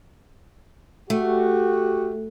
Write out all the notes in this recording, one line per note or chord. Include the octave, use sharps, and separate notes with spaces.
A3 F#4 G4